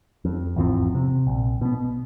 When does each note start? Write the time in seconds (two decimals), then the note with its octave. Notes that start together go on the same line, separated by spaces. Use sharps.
0.25 F2
0.56 G#1 E2 F3 C4
0.95 C3
1.27 A#1
1.61 B2 B3